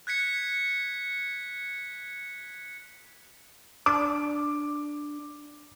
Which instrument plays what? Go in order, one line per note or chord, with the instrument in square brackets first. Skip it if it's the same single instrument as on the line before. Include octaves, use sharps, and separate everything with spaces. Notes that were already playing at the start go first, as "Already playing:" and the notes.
[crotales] F#6 G#6 B6 C#7
[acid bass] D4 [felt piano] D6